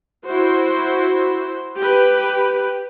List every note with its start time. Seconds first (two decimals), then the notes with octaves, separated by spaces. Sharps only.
0.26 E4 F#4 C5
1.78 G4 B4